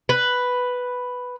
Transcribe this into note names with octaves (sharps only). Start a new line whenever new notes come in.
B4